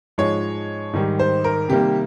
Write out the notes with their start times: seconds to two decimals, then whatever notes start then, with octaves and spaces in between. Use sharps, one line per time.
0.18 G#2 F3 G#3 C#5
0.93 G#2 D#3 G3
1.19 C5
1.44 A#4
1.69 C3 D#3 G3 A#3 G4